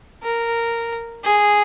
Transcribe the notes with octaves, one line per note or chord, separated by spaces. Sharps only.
A#4
G#4